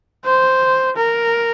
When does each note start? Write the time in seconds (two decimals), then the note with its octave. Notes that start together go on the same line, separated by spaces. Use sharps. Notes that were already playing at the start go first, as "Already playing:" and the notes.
0.25 C5
0.96 A#4